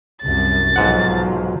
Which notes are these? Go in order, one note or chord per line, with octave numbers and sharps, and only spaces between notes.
C2 F#2 A6
B1 G#2 F3 F#3 F#5